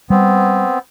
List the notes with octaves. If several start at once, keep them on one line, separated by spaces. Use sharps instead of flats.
G3 B3 C4